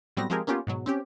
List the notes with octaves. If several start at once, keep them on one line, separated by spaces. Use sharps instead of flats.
A2 F#3 G3 B3 C4 A#6
F3 G#3 C4 G4 G#4 A#4
A#3 B3 C#4 F4 G4
G#2 B2 F#3
C4 C#4 G4